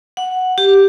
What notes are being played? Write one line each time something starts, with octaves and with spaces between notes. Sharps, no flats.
F#5
G4